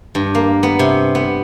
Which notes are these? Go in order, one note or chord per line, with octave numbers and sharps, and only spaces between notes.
G2
A#3
B3
C3
B3